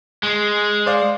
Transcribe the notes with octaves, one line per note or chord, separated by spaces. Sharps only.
G#3
C5 D5 F5